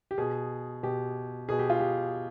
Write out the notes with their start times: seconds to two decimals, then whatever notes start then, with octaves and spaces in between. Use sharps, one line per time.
0.11 G4
0.18 B2 G#4
0.83 B2 G4
1.49 B2 G#4
1.59 G4
1.70 F4
1.80 G4